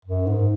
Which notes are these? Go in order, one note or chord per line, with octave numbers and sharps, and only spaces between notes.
F#2
G#2